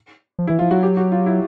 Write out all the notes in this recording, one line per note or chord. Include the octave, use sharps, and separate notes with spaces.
F3
E3 E4
F3 F4
F#3 F#4
G4
F#4
F4
E4